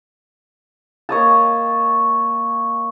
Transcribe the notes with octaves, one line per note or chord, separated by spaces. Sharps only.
A#3 C#5 D#5 A5